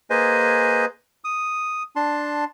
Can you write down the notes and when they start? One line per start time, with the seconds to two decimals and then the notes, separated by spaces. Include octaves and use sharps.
0.10 A#3 G#4 B4 C5 D#5 G#5
1.24 D#6
1.96 D4 A5 C6